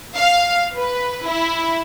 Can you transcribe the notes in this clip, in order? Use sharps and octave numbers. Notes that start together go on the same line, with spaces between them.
F5
B4
E4